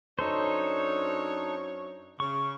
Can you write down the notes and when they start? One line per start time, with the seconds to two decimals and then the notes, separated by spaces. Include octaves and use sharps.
0.19 F#2 D4 D#4 A4 C5 C#5
2.20 C#3 C#6